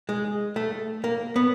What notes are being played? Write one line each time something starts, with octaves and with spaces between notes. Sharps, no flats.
G#3
A3
A#3
B3